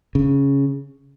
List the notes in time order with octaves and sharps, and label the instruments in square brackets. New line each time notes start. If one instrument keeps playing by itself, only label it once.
[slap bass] C#3